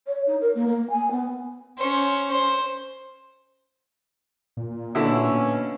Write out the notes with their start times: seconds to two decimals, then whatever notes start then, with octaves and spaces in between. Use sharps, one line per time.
0.06 C#5
0.26 D#4
0.40 A#4
0.54 A#3
0.66 A#3
0.89 G#5
1.10 B3
1.78 C#4 C5
2.31 C5
4.57 A#2
4.95 B2 D3 A#3 C#4 E4